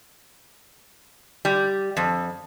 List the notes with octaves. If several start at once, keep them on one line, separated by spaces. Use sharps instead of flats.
G3
F2